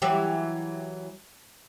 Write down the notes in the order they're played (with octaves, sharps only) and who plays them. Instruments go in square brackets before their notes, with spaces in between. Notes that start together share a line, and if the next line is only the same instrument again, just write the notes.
[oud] E3 F#3 G4